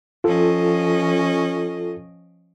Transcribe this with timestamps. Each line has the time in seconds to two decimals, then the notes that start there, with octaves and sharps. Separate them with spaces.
0.24 F3 C#4 F4 A4 D#5